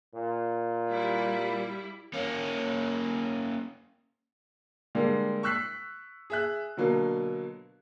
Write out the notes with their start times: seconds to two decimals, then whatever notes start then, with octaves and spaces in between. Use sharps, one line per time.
0.14 A#2
0.89 G3 E4
2.13 A#3 C#4
4.95 D3 G3 G#3 A#3
5.43 C#6 E6 F#6 B6 C7
6.30 G#4 E5 F#6
6.77 B2 D3 F#3 A#3